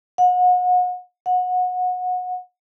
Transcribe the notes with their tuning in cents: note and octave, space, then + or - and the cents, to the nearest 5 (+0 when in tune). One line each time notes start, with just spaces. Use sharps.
F#5 -35
F#5 -25